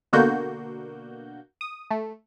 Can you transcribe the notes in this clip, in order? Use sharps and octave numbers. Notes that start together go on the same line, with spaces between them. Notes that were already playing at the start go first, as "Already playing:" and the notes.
B2 D3 A#3 F#4 G6
D#6
A3